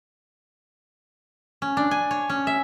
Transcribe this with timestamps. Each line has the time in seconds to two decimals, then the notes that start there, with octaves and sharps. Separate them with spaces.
1.62 C#4
1.77 D4
1.91 G#5
2.11 C#5
2.29 C#4
2.47 E5